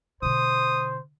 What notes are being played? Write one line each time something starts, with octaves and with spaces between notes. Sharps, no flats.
B2 D3 C5 D#6